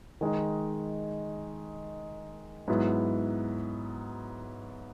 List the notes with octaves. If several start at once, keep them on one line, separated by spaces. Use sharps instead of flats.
D#3 G#3 D#4
G#2 F#3 B3 E4